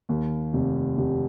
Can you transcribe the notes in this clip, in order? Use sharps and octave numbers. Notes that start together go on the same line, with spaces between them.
D#2
F1
F1